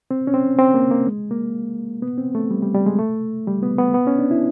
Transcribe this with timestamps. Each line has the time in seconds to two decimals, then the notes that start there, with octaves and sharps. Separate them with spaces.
0.11 C4
0.27 C#4
0.34 C4
0.59 C4
0.74 A#3
0.91 A#3
1.07 G#3
1.31 A#3
2.02 B3
2.18 C4
2.35 A3
2.51 G3
2.62 G3
2.74 G3
2.86 G#3
2.99 A3
3.47 G3
3.63 B3
3.79 B3
3.94 B3
4.07 C#4
4.19 D4
4.31 E4